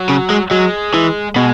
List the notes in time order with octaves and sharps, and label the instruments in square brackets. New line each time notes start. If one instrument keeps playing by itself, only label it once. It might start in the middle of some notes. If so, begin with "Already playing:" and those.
Already playing: [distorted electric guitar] F#3
[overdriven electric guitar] C#3
G#3
[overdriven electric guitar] F#3 [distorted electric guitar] G#3
[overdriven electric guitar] E3
[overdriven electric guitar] B2 [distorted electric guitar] G#3